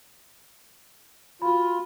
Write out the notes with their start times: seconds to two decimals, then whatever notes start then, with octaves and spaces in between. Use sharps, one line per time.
1.42 F4 F#4 B5